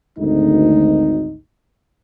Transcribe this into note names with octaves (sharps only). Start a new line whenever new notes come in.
G#1 D2 D#4